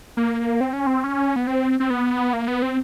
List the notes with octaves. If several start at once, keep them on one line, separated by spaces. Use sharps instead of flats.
A#3
C4
C#4
C4
C#4
B3
C4
C4
B3
A#3
B3
C4